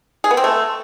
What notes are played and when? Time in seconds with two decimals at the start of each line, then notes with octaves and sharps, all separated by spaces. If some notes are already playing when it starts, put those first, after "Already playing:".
0.24 G#4
0.31 B3
0.37 C4
0.44 A3